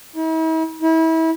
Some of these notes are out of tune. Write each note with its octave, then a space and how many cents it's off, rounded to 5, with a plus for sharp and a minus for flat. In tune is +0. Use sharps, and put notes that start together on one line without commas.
E4 -45
E4 -30